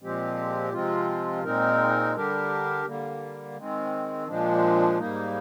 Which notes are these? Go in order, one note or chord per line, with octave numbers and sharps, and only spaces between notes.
A#2 F3 G#3 C4 G4
C3 F3 G#3 C4 F4
A#2 G#3 C4 D#4 A#4
D3 G3 D4 G4 A#4
D3 G3 A#3
D#3 G#3 C4
A#2 F3 G#3 D4
G#2 G3 A#3 D#4